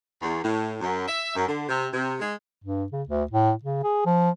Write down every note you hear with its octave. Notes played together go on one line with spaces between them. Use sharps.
E2
A2
F#2
E5
F#2
D3
C3
C3
G#3
G2
C#3
D2
A2
C#3
G#4
F3